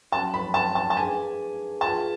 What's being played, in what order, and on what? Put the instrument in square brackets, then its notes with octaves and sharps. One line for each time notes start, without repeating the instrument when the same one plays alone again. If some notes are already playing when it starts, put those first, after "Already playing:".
[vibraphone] F#3 C#4 F#4 [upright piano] A5
[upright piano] B5
A5
A5
A5
[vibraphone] D4 G#4 B4 F5 [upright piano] G#5
[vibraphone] F4 G#4 B4 F5 [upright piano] A5